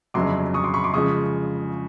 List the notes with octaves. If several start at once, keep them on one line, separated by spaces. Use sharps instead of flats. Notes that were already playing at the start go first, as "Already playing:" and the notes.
G1 F2 C#3 F#3 C6 D6
C#6 D#6
C6 D6
B5 C#6
C6 D6
C#3 F3 G#3 C#6 D#6